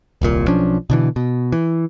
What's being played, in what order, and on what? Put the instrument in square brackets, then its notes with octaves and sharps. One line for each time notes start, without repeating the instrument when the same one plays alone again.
[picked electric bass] D#1 C2 A#2
B1 F3 C#4 D4
B2 D3 E3
B2
E3